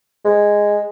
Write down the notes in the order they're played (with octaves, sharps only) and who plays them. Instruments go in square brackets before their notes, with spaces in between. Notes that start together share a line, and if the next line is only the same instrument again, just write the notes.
[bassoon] G#3